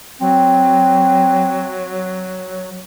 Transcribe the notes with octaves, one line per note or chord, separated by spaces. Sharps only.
F#3 C4